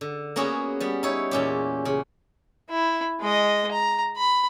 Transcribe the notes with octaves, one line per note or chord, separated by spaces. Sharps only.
D3
A#3 B3 C#4 F#4 G#4
G3 B3
D#4 E4 C#5
E2 A#2 C#4 G4
C#3
E4
G#3 D#5
A#5
B5